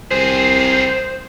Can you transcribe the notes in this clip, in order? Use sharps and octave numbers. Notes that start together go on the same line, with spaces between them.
C2 C4 G#4 C5